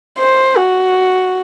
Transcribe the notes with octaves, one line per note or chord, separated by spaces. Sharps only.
C5
F#4